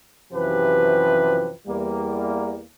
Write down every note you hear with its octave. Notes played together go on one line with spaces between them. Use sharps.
F#2 C3 E3 F3 G4 B4
E2 G3 A#3